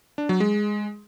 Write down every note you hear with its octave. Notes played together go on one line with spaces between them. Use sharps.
D4
F#3
G#3